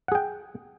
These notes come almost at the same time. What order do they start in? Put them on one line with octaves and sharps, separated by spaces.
F#5 G#4 G5